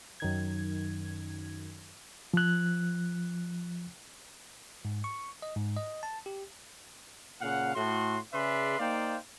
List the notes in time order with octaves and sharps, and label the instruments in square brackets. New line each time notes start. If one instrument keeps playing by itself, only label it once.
[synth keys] F#2 D#3 G#6
[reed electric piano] F3 F#6
[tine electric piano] G#2
C#6
D#5
G#2
D#5
A5
G4
[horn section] A#2 C#3 F5 F#5
A2 F#4 C6
C#3 G#4 B4 D5 E5 C6
A#3 D#4 C5 D5 F5 G5